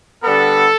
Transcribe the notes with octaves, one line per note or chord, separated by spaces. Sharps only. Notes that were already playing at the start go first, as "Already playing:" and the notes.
D3 G3 B3 A4